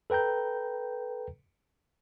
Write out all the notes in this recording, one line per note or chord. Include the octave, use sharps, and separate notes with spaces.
A4 B4 G5 A#5 G6